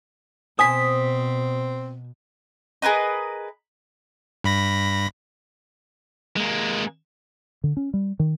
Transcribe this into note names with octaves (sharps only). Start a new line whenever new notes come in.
B2 C4 C5 G#5 D#6 B6
G#4 A#4 B4 D#5
G2 B5 A#6
G#3 A#3
D3
C#4
G3
D#3